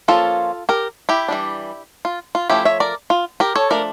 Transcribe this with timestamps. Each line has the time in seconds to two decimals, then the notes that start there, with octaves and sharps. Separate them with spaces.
0.08 F3 A#3 C#4 F4 A4
0.69 G4 A#4
1.09 E4 G4
1.28 E3 G3 D4
2.05 F4
2.35 F4
2.49 F3 A3 C#4 E4 G4
2.65 C#5 E5
2.80 A#4 D5
3.10 F4
3.40 G4 A#4
3.55 A4 C#5
3.70 F3 A3 D4 A#4 D5